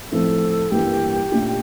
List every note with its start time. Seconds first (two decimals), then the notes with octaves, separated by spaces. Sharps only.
0.12 A2 F3 C4 A4
0.71 G2 E3 G3 A#3 G4
1.32 A#2 A3 D4 F4